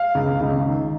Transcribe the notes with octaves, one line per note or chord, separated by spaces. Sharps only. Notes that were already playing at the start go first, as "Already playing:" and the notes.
Already playing: F5
C#2
C#2
D#3